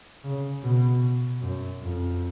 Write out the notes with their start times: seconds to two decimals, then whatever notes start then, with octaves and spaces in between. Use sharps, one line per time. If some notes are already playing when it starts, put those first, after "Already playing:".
0.24 C#3
0.63 B2
1.42 F#2
1.81 F2